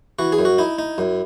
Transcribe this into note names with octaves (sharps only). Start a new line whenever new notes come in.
E3 F#4
G#4
F#2
F#4
D#4 E4
D#4
F#2